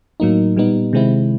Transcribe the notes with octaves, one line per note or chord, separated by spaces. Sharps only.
A2 F#3 A#3 D#4
A#2 G3 B3 D#4
C3 D#3 G#3 C4 E4